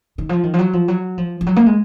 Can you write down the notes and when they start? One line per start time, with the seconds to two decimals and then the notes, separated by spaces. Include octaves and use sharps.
0.18 D#3
0.29 F3
0.43 D#3
0.53 F3
0.59 F#3
0.73 F3
0.88 F#3
1.18 F3
1.41 F3
1.46 F#3
1.56 A#3
1.66 G#3